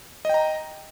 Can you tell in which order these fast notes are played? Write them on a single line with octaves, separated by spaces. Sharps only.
D#5 G5 A#5